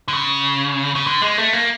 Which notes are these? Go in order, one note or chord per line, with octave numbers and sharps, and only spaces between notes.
D3
C#3
C#3
D3
G#3
A3
A#3